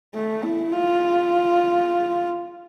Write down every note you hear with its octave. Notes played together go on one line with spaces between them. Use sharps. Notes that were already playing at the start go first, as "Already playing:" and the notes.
A3
E4
F4